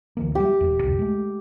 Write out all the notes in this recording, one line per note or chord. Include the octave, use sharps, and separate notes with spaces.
D2 E3 A#3
G3 B3 D4 G4
D#1 A#1 E2
C2 F2 C3
G#3 A3